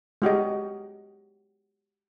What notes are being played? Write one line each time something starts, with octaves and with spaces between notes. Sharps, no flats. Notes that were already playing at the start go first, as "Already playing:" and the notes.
G#3 F#4 G4 D#5